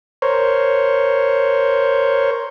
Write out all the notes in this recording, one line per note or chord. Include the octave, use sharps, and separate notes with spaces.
A#4 C5 C#5